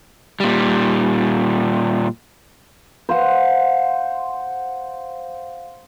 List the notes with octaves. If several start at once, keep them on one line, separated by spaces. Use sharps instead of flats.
A#2 G3
C5 F5 F#5